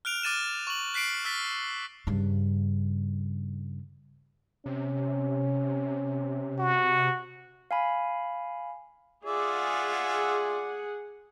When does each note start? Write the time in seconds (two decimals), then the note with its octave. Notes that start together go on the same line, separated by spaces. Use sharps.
0.05 F6 F#6 D7 F7
0.23 D6 F6 A6 D#7 E7
0.67 C#6 F#7
0.94 F#6 B6 C7 D7 F#7
1.25 E6 F6 A6 B6
2.07 G2 C#3
4.66 C3 C#4
6.59 F#4
7.71 F5 G#5 B5
9.25 F4 G#4 D5 E5 F#5